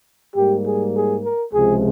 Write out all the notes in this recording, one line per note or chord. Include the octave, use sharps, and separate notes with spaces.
G#2 G3 A#3 G4
G#4
G#4
A#4
C#2 C3 F3 G#3 G#4